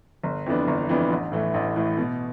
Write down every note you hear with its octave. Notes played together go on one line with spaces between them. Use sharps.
G1
F2 E3 B3 D4
G1
F2 E3 B3 D4
A1
A2 E3 A3
A1
A2 E3 A3
B2